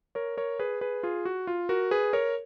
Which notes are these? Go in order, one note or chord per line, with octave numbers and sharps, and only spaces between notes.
A#4 C#5
A#4 C#5
G#4 B4
G#4 B4
F4 G#4
F#4
F4
F#4 A#4
G#4 B4
A#4 C#5